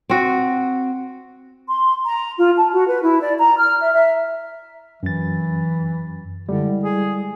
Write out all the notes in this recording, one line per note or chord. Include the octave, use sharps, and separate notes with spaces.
C4 F#4
C6
A#5
F4
A5
F#4
B4
E4
D5
A#5
F6
E5
E5
F#2 E3 A6
D3 G3 G#3 E4
G#4